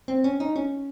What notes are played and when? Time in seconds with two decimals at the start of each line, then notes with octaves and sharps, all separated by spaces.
0.08 C4
0.24 C#4
0.40 D#4
0.56 C#4